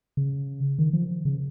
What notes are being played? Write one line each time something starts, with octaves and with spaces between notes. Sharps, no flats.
C#3
D#3
F3
C#3